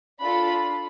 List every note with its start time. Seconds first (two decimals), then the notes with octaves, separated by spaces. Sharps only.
0.20 D4 F4 A4 B5